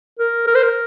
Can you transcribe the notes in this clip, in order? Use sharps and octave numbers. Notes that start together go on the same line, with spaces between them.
A#4
A#4
C5
A#4